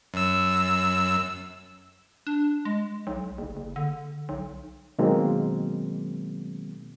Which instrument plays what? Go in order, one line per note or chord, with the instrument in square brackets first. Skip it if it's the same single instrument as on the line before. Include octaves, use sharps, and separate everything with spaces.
[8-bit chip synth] F#2 E6
[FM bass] D4
G#3
B1
F#1
F#1
D3
B1
[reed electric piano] B2 D#3 F#3 G#3 A#3 C4